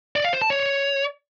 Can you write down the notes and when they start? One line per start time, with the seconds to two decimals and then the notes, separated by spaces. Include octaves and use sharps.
0.16 D5
0.24 F5
0.33 C5
0.42 A5
0.50 C#5